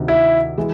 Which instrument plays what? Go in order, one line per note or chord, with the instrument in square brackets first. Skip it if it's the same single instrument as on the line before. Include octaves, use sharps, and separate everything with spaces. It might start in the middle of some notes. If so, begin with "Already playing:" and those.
Already playing: [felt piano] D2 C3 D#3
[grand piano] E4
[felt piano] E3 G#3